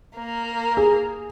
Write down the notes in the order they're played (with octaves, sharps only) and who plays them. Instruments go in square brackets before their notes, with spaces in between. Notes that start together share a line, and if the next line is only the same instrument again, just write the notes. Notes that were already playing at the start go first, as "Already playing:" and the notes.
[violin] A#3 A#4
[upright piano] G#4